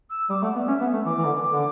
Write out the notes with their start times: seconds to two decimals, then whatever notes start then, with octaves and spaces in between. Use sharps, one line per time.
0.10 E6
0.30 G3 D6
0.42 A3 F#5
0.55 B3 D5
0.68 C#4 E5
0.81 B3
0.93 A3
1.06 E3 D6
1.17 E3
1.25 D3
1.44 D6
1.52 D3